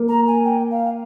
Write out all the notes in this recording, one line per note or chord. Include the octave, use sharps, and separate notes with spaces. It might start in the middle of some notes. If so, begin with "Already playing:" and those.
Already playing: A#3
A#5
G#5
G5
F5